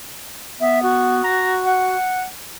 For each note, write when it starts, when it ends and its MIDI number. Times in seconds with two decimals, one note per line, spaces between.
0.60 1.21 59
0.60 0.79 76
0.83 1.96 66
1.24 1.53 82
1.65 2.24 78